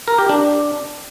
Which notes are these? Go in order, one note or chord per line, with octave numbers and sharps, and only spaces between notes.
A#4
G4
D4